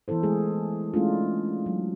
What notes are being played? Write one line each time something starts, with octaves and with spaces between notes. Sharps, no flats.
E3 B3 E4 A4 C5
G#3 A3 G#4
G#3 A3 C#4 D4 E4 F4
F#3